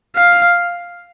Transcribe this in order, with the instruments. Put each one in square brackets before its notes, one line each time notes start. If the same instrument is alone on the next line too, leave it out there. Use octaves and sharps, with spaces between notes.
[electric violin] F5